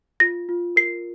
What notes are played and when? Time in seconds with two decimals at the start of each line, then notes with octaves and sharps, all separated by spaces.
0.20 F4 A#6
0.49 F4
0.76 A#4 C7